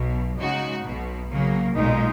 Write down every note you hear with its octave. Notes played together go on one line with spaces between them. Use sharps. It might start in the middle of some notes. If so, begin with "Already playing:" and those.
Already playing: B1 B2 F#3
C#3 G#3 D#4 F#4
B1 B2 F#3
C#3 F#3 A#3
B1 A#2 G#3 D#4